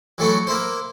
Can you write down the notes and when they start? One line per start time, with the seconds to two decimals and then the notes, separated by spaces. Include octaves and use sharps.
0.18 E3 F#3 A3 E4 F#4
0.47 A#3 E4 C5